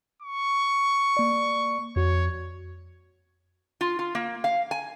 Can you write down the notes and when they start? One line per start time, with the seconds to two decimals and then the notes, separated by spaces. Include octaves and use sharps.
0.22 C#6
1.17 A#3 D5
1.96 F2 F#4 C#5
3.81 F4
3.99 F4
4.15 A#3
4.44 F5
4.71 G#5